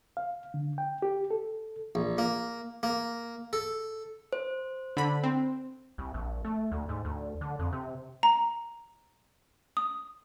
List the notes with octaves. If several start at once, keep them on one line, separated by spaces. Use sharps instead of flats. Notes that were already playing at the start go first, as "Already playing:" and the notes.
F5
D3
G5
G4
A4
A#1
A#3
A#3
A4
C5
D3 B5
C4
C2
A#1
A3
D2
G#2
D2
D3
F2
C3
A#5
D#6